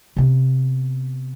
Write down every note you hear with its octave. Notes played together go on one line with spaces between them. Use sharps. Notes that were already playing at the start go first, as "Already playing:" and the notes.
C3 B3